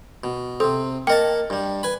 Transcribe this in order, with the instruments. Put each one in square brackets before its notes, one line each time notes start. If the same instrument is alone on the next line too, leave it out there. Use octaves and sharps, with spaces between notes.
[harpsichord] B2
[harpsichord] C3 C4 [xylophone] A4
[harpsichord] A#3 A#4 A5 [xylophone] D#5 G5
[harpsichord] G2 G3
B4 G#5 B5